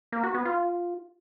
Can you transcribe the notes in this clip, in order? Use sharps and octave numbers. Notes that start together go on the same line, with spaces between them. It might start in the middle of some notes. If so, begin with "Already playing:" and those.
A#3
F#4
B3
F4